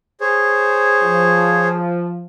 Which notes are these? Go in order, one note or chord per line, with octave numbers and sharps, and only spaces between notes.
G#4 C5 C#5
F3